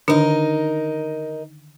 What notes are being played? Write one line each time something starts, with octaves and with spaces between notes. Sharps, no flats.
D3 D#3 D4 D#4 A#4